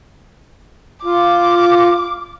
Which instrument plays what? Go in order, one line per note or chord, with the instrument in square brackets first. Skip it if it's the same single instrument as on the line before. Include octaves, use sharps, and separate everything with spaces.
[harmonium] F4 [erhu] D6